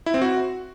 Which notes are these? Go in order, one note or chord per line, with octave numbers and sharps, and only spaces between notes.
E4
C4
F#4